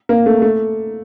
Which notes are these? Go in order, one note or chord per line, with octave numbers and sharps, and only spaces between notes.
A#3
A3
A3